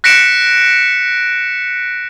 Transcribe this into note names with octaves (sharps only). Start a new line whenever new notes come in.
F#6 A#6 B6 C#7 D7 E7